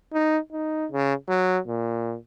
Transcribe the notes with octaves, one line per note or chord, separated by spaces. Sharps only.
D#4
D#4
C#3
F#3
A#2